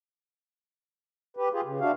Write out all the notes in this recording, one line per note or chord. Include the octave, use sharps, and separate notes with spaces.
G4 B4
F4 G4 G#4
C#3
D4 E4 F#4 F5